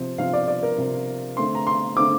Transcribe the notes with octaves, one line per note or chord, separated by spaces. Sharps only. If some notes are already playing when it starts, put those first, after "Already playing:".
Already playing: C3 F3 C4
C3 F3 C4 F5
D5
D5
A#4
C3 F3 C4
D3 A3 C4 C6
A#5
C6
D3 A3 C4 D6